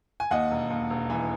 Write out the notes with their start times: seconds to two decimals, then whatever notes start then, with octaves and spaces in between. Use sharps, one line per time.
0.20 G#5
0.31 D#2 D#5 F#5
0.51 E1
0.70 D#2
0.90 E1
1.10 E3